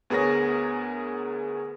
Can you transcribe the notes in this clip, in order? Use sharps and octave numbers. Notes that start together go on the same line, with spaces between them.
D2 B3 G#4 A#4 C#5 A#6